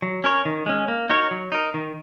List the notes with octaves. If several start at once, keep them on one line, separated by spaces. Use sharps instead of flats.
F#3
C#4 A#4 C#5
D#3
G#3 C#4
A#3
D#4 F#4 A#4 C#5
F#3
D#4 A#4
D#3